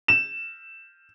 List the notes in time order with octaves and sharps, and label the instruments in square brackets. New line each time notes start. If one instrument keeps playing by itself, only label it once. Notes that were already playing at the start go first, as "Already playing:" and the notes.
[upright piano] E7